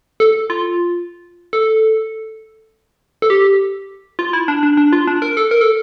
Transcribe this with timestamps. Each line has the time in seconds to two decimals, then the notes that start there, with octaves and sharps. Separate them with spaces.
0.20 A4
0.50 F4
1.53 A4
3.22 A4
3.30 G4
4.19 F4
4.33 E4
4.48 D4
4.63 D4
4.77 D4
4.93 F4
5.07 D4
5.22 A#4
5.37 A4
5.51 A#4
5.61 A4